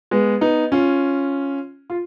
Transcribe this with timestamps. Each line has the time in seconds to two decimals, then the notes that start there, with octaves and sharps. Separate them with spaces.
0.11 G#3 B3
0.41 B3 D#4
0.72 C#4 F4
1.90 F4